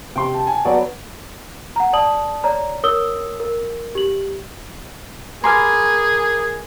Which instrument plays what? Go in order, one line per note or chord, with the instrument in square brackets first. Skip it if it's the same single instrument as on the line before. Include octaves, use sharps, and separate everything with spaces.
[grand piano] C3 C6 [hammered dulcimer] G5
[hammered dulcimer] A5
[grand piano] G#5
[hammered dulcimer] F#3 B3 [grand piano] C#5 D5
[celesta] F#5 A#5
D5 A5 D#6 F#7
C#5 D5 A#5
A#4 C#5 D#6 E6 G7
A#4
G4 F#7
[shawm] G#4 [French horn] A#4 [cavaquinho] B4 G#5 C6 [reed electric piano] A#5 D6 F6